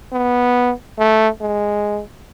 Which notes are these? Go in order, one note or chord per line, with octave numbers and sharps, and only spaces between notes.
B3
A3
G#3